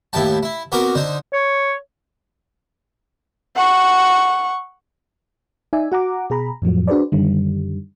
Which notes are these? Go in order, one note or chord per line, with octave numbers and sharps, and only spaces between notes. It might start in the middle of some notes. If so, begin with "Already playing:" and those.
D#2 A2 E4 G5 A5
E4
B3 C4 F#4 A#4 D6
D3 D#4 C5
C#5
F#5 C#6
D#4 D5 E5 G#5
F#4 F#5 A#5 D6
B2 G#4 A#5 B5
F2 A2 F3 F#3
D4 F#4 G#4 B4 C5 D5
F#2 D3 D#3 G3